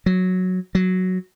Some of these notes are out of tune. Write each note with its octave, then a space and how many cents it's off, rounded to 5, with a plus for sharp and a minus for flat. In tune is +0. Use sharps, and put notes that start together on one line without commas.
F#3 -5
F#3 +0